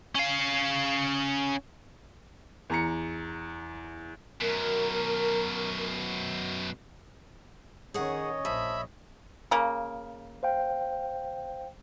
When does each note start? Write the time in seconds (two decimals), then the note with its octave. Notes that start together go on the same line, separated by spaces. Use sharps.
0.15 C#4 F5
2.70 E2 A#5 C#7
4.41 F#2 B2 A#4
7.94 D#3 C#4 G#4 C#5 D#5 F#5
8.45 A#1 F3 E5 B5
9.51 C#3 A#3
10.43 C5 F5 G5